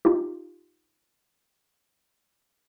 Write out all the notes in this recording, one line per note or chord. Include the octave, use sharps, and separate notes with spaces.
D#4 F4 G4